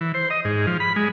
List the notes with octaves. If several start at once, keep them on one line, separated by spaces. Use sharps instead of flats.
E3
C5
D#5
G#2
F3
B5
G#3